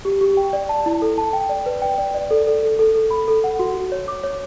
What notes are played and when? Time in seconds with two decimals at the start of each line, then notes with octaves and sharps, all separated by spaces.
0.05 G4
0.21 G4
0.37 G5
0.53 D5
0.69 A5
0.86 E4
1.02 A4
1.18 A5
1.33 G5
1.49 D5
1.66 B4
1.82 G5
1.98 D5
2.15 D5
2.31 A4
2.47 A4
2.63 A4
2.79 A4
2.94 A4
3.11 B5
3.28 A4
3.44 F#5
3.59 F#4
3.75 F#4
3.92 C#5
4.08 D6
4.24 C#5